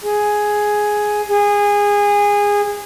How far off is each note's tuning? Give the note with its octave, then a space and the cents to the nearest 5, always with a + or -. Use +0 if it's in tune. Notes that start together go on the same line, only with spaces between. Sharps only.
G#4 +5
G#4 -20